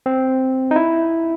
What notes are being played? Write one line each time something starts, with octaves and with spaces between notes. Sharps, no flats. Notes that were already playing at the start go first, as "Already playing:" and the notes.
C4
D#4
E4